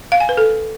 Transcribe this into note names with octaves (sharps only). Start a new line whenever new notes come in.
F5
G#5
B4
A4